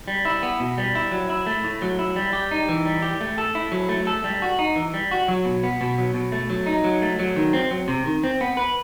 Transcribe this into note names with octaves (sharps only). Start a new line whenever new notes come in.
G3
E4
B3
B2
G3
E4
F#3
E4
A3
A2
F#3
E4
G3
G4
D#4
E3
G3
G4
A3
A4
E4
F#3
A3
A4
G3
F#4
D#4
E3
G3
F#4
F#3
B2
B3
B2
F#3
B2
A3
F#3
D#4
F#3
A3
F#3
D#3
C4
F#3
C3
D#3
C4
B3
B4